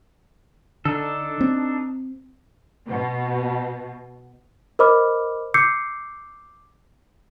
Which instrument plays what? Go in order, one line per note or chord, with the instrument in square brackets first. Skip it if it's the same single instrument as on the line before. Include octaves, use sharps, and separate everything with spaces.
[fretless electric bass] D3 [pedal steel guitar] D4 D#4 A4
[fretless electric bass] C4
[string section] B2
[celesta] A#4 C5 D#5 B5 D6 F6
D6 E6 G6 C7 C#7